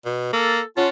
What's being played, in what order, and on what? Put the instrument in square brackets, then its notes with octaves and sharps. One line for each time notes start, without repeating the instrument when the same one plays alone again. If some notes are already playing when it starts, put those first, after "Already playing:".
[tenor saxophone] B2
[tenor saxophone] A#3 [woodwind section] A4
[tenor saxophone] C#4 [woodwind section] F4 F#5 A5